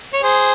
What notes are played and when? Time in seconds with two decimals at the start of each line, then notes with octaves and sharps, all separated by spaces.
0.14 C#5
0.23 G#4 C5